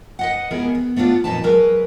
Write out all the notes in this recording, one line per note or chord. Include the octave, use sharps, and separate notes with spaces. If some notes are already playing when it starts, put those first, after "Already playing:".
B4 D#5 F#5
G#3 B3 E4 G4 G#4 A#4
B3
A3 B3 D4 F4 D5
F2 A#2 F#3 D#4 B4 A5
F#3 G#3 A#4 B4